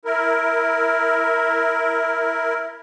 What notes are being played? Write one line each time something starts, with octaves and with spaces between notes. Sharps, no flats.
E4 A#4